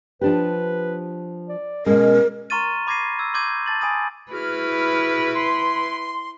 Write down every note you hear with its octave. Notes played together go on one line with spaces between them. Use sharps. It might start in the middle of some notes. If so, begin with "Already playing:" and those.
F3 D4 G4 B4
D5
B2 G#3 C#4 A#4
A#5 C6 C#6 F6 A6 D#7
B5 D6 G#6 A#6 C7 D#7
E6 G#6
C6 D6 G6 G#6 D#7
A5 A6 F#7
G#5 B5 D#6 A6
E4 F#4 G#4 B4 F6
C6